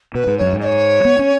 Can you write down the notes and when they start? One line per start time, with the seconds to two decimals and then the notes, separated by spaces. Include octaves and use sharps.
0.14 B2 B4
0.27 G#2
0.37 F#2 C#5
0.53 G#2
0.59 D#5
0.64 C#5
1.05 B3
1.19 C#4